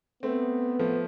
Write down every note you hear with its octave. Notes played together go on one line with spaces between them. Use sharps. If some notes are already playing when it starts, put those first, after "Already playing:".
A3 B3 C4
F3 A3